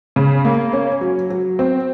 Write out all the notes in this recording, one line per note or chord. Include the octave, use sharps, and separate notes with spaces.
C#3
A#3
C#4
F#3
F#3
C4